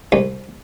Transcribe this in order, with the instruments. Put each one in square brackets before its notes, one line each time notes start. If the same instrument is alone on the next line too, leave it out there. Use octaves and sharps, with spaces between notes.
[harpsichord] C2